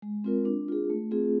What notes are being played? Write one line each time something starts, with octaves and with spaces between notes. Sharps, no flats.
G#3
C4 F4 A#4
D4
F4 G#4
A3
C4 F4 G#4